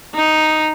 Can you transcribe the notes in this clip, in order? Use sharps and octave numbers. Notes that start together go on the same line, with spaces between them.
D#4